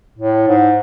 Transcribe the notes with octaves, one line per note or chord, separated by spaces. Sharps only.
A2
G#2